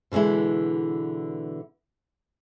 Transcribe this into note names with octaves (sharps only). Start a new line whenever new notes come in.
B2 D3 E3 G#3 E4